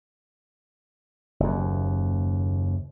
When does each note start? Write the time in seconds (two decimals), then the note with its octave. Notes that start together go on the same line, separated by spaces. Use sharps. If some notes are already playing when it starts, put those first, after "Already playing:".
1.40 F#1 D#2